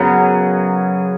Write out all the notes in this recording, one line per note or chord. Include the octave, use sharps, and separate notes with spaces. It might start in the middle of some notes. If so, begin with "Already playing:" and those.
Already playing: F#2 C#3 F#3 B3